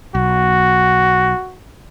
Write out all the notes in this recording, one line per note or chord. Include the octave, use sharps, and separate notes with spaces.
B1 F#4